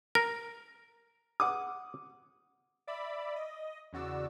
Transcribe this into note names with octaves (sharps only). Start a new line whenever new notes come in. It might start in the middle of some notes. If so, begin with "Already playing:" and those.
A#4 A#6
F#5 D6 D#6
D5 E5 B5
D#5
E2 C#3 F#4 D5 E6